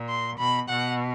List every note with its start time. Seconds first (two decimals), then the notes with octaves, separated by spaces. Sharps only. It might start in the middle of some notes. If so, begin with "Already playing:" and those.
Already playing: A#2
0.09 C6
0.38 B2 B5
0.69 B2 F#5